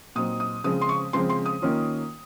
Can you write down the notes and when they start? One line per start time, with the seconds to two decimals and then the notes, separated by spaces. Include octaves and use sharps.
0.15 A#2 F#3 C4 D#4 D#6
0.40 D#6
0.64 C#3 F3 G#3 C4 D#6
0.81 C6
0.89 C#6
1.13 C#3 F3 G#3 C4 C6
1.29 C6
1.46 D#6
1.62 D#3 A#3 C#4 F4